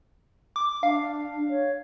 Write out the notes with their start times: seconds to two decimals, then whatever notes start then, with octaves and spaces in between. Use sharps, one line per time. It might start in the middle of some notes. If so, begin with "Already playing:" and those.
0.56 D6
0.83 D4 F5
1.50 C#5